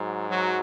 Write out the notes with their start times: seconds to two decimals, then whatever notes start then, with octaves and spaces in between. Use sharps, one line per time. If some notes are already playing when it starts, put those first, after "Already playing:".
Already playing: G#2 F#3
0.30 F#3